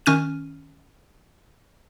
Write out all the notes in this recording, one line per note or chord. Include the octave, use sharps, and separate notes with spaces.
D#3 C#4 F6 D#7